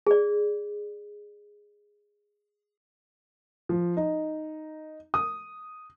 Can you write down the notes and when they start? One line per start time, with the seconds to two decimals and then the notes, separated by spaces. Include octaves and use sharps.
0.07 G#4 D5
3.69 F3
3.97 D#4
5.14 D#6